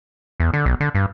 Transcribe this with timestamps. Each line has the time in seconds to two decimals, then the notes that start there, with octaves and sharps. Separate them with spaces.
0.40 E2
0.54 D3
0.66 B1
0.81 D3
0.95 G2